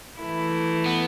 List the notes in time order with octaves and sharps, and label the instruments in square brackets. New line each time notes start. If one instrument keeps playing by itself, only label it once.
[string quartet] E3 A3 E4
[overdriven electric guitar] B3